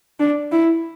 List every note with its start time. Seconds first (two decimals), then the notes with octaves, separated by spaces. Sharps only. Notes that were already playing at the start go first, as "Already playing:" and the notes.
0.20 D4
0.52 E4